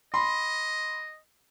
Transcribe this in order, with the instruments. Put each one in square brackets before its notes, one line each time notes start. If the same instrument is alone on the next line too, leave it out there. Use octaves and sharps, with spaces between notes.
[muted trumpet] D#5 [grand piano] B5 C6